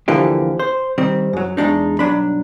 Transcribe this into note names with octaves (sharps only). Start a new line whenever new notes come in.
D2 D3 E3 F3 A#3 G4
C5
D#3 G3 C4
F#2 F#3
E2 G#3 D4 D#4
B1 G2 F#3 D4 B5